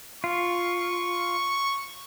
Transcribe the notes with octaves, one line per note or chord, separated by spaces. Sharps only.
F4 C#6